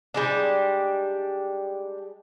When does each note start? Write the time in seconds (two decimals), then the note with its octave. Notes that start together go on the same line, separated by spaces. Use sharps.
0.14 G3 G#3 D4